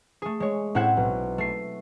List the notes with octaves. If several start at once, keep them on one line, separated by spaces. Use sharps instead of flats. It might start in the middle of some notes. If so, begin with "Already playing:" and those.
A3 G#4
G#3 C#5
A2 C4 E4 F#5 F#6 G#6
B1
A3 C7